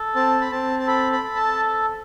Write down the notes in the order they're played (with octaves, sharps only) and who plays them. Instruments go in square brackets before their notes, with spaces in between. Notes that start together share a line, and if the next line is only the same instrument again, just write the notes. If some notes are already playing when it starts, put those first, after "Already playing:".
Already playing: [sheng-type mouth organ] A4
C4 A5
B5
C4 A5
A5
A4 B5
B5
A4
A5